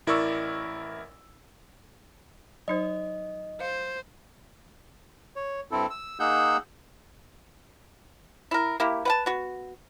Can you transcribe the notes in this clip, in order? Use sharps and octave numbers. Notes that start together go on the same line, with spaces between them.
A1 E4 A#4 D5 C#6 E6
F#3 D#4 C5 D#5
C5 F5
C#5
G2 C4 E4 A4
E6
A#3 D#4 G#4 F#5 E6 G6
E4 A#4
A#3 E4 G4
B4 F#5 A5
B3 F#4